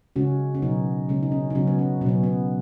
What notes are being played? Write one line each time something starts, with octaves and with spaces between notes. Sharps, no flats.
C#3 G#3 C#4 F#4
C#4
B2 F#3 B3 D#4
C#3 G#3 C#4
D#4
C#4
D#4
C#3 F#3 C#4 F#4
B3
C#4
B2 F#3 B3 C#4
B3